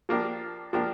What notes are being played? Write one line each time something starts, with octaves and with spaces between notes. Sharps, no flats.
F3 A#3 D4 G4
F3 A#3 D4 G4